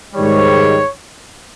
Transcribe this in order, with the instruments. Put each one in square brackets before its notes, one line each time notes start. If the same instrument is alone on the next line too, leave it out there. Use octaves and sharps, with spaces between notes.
[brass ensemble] G#2 D#3 G3 C#5